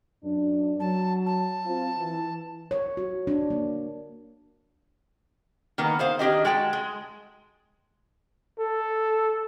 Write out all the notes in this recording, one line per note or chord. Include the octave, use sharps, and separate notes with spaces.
F#2 D4
F#3 A5
A5
C4 F4
E3
C#5
F#4
D4
A#3
D#3 A#3 B3
G#4 C5 F5
D#3 D4 G4 G#4 D#5
G#3 F#4 G5 A5
G#3
A4